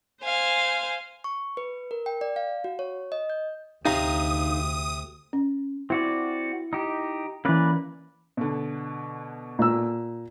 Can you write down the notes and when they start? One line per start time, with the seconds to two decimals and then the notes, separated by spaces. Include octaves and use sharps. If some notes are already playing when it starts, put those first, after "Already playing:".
0.22 C5 F5 G#5
1.24 C#6
1.57 B4
1.91 A#4
2.06 G5
2.21 D5
2.36 F5
2.64 F#4
2.79 C#5
3.12 D#5
3.30 G6
3.86 D2 C3 D#4 F5 A#5 D#6
5.33 C#4
5.90 C4 E4 F#4 D5
6.73 D#4 G4
7.45 E3 A#3 C#4 B4 D5
8.37 B2 D3
9.59 A#2 E6